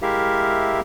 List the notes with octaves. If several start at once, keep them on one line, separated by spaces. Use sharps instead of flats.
G#3 E4 G4 A#4 E5 F5